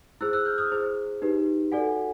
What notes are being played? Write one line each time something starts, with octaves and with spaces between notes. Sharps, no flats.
E4 G#4 C5 E6 F#6
E6 F#6
F6 G6
D#6 F6
E4 G#4 C5
D#4 G4 B4
F#4 A4 D5 F#5 G#5